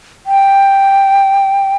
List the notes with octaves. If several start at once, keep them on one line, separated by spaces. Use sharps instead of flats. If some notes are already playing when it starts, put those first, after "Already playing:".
G5